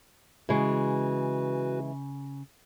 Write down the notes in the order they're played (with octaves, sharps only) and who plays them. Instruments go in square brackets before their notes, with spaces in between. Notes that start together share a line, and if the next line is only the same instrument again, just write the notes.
[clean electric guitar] C#3 [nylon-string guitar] E3 G#3 [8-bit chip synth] F#4 B4